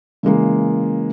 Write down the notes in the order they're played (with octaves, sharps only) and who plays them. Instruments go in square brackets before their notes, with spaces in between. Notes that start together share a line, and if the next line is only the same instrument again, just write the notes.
[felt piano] C#3 E3 G#3 A#3